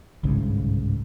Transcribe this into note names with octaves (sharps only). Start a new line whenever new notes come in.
G1 C2 G#2 C#3